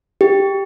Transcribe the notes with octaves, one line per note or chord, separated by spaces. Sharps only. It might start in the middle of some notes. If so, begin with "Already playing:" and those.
G4